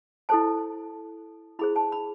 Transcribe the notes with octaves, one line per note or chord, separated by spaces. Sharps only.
E4 A4 C5 A5
E4 G#4 C5 B5
A5
B5